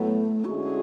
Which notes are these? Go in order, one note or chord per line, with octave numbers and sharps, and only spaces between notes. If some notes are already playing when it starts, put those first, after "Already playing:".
Already playing: A2 F#3 A3 B3
D3 G#3 C#4 E4 F#4 G#4